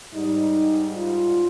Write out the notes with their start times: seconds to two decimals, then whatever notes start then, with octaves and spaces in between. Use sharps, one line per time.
0.14 G#2 G3 D#4
0.97 F4